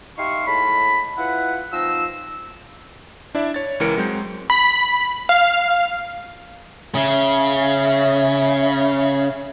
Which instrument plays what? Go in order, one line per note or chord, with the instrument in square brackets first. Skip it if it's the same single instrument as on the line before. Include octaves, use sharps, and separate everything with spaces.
[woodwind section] D#4 G4 E5 F5 C6 C#6
A2 G#3 A5 B5
E4 F4 B4 F#5
F3 C4 D#4 C5 D#5 E6
[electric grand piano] D4 E4 D5 E5
C#5 A6
C#2 E3 A#4 C#7 D7
F#3 G#3 C4 G6
[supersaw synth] B5
F5
[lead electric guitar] C#3 [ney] E5